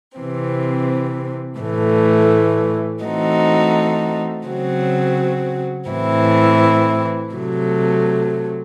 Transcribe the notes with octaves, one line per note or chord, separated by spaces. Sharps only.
C3 E3 C4
A2 E3 A3
E3 A3 C4 D#4 F#4
C#3 F#3 C4 F#4
A2 E3 C4 E4
C3 F#3 A3